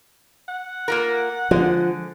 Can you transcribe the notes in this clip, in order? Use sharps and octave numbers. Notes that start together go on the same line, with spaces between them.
F#5
A#3 F4 A#4
D3 F3 G#3